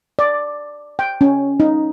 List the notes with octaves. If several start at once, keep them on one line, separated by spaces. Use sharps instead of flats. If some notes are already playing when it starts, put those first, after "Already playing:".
D5
G5
C#4
D#4